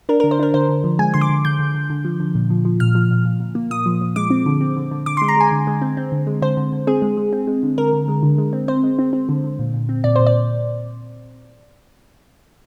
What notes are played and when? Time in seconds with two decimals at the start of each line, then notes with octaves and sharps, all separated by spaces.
0.09 D4 A#4
0.20 A#4
0.24 D3
0.31 C5
0.39 D4 A#4
0.54 D3 C5
0.69 D3
0.84 F3
0.99 G#3 G#5
1.14 D3 C6
1.21 D6
1.29 D3
1.45 D3 G6
1.59 D3
1.75 D3
1.90 D3
2.05 F3
2.20 D3
2.35 A#2
2.50 F3
2.65 F3
2.80 A#2 F6
2.95 F3
3.11 A#2
3.25 A#2
3.40 A#2
3.55 A#3
3.71 A#2 D#6
3.86 F3
4.01 F3
4.16 G#3 D6
4.30 C4
4.46 D3
4.61 C4
4.76 D3
4.91 D3
5.06 D3 D6
5.17 C6
5.22 G#3
5.28 A#5
5.37 G#3 G#5
5.52 D3
5.67 G#3
5.82 C4
5.97 C4
6.12 D3
6.27 G#3
6.42 D3 C5
6.57 D3
6.72 D3
6.87 C4 G#4
7.02 G#3
7.17 G#3
7.33 C4
7.47 G#3
7.63 D3
7.78 D3 A#4
7.93 D3
8.08 G#3
8.23 D3
8.38 G#3
8.53 C4
8.68 C4 C5
8.83 G#3
8.99 C4
9.13 C4
9.29 D3
9.44 D3
9.59 A#2
9.74 A#2
9.89 C4
10.04 A#2 D5
10.16 C5
10.19 A#2
10.27 D5